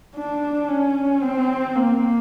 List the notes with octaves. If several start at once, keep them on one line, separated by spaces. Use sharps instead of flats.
D4
C#4
C4
A#3